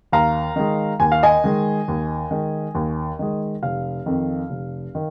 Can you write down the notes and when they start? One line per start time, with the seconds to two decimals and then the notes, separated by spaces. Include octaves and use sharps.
0.12 D#2 F5 A#5
0.56 D#3 G#3
1.00 D#2 G#5
1.12 F5
1.23 D#5 G#5
1.44 D#3 G#3
1.88 D#2
2.31 D#3 G#3
2.75 D#2
3.19 D#3 G#3
3.62 F1 F5
4.06 F2 D#3
4.50 F1
4.95 D#3